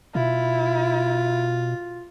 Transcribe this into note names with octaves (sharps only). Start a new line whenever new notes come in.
B2 E4 F4